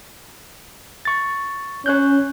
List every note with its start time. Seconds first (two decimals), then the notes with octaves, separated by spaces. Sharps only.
1.05 C#6 A6
1.86 C#4 C#5 F#6 G6